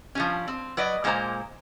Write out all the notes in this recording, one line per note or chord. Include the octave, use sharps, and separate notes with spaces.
F3 G3 C#4
C4
F#3 B4 D5 D#5
A#2 G#3 A#3 E4 C5 A#5